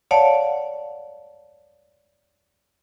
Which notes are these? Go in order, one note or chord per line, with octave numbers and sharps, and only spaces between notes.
C#5 D5 F5 F#5 A5